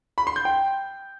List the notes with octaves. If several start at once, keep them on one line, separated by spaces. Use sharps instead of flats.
B5
C6
G6
G5